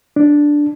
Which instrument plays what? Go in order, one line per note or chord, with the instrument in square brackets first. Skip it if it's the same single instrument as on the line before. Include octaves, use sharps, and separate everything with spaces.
[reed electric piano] D4